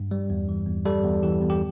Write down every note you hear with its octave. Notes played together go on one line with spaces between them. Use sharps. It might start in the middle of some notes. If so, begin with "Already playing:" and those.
Already playing: G2
G3
E2
E3
E2
G3 A4
E2
E3 G4
E2
G4